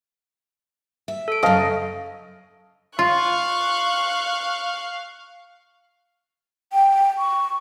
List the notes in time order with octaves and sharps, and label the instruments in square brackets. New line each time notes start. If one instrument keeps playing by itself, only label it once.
[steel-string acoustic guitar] E5
[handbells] A4 D7
[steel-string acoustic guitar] F#2 C#3 [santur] D#5 F5 A5
[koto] F4 [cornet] F5 [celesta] C6 [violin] C#6 F#6
[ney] G5
C#6